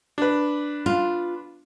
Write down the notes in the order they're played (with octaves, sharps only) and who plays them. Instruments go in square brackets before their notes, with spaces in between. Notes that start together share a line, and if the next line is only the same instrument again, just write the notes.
[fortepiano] D4 B4
[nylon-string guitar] F4